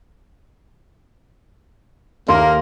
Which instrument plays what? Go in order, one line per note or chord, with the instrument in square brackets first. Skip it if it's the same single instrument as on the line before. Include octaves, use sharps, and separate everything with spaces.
[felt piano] D#2 [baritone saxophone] A#3 [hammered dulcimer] A#4 C6